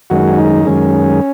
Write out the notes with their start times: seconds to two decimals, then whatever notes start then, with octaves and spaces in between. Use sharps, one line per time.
0.10 F#2 D#3 G#3 F#4
0.38 D#4
0.65 F#2 D#3 G#3 C#4